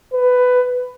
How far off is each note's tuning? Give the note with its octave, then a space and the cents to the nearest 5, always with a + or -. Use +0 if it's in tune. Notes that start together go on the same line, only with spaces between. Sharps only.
B4 +15